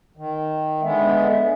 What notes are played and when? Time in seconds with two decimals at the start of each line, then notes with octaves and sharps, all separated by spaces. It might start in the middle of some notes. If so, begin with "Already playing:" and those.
0.17 D#3
0.82 D3 G#3 B3 E5